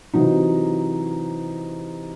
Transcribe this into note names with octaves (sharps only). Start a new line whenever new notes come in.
C3 E3 F#3 D#4